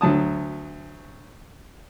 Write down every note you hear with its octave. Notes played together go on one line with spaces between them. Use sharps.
D2 F#3 A5 D#6